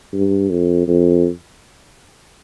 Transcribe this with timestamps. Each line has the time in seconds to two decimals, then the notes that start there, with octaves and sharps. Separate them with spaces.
0.13 G2
0.50 F2
0.88 F2